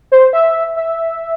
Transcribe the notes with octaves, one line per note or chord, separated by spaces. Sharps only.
C5
E5
E5